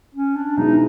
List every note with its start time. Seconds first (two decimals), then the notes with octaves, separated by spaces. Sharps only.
0.15 C#4
0.36 D4
0.57 B2 G#3 B3 D#4 E4 G#4